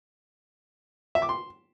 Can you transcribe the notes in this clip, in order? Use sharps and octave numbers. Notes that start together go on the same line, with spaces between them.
E5
D6
C6